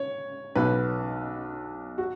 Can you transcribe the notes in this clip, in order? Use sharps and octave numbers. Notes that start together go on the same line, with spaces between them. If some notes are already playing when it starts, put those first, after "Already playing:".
Already playing: C#5
B1 B2 B4
F#4